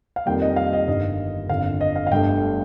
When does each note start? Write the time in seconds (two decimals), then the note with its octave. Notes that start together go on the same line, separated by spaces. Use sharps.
0.16 F5
0.26 F2 D#3 G3 A#3 G5
0.42 D#5
0.56 F5
0.73 D#5
0.88 G1 G2 D#3 D#5
1.49 G1 F2 D3 F5
1.81 D#5
1.96 F5
2.07 F5
2.11 G1 G2 D3 A3 G5